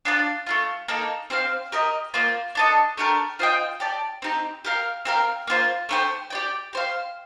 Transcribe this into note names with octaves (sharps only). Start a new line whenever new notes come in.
D4 F4 A4 D5
A3 D4 F4
A#3 D#4 A4
C4 G4 C5 F5
G4 A#4 D#5
A#3 F4 C5
D4 A4 D#5
A3 D4 G4 A#4
F4 C5 D#5 G5
G4 D5 A5
C4 D#4 G4
G4 A#4 F5
C4 G4 A#4 F5
A#3 F4 C5
A3 D4 G4 C5
G4 D5 G5
G4 C5 F5